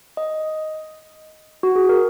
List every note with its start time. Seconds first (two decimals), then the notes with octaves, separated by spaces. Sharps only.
0.17 D#5
1.63 F#4
1.76 G#4
1.89 A#4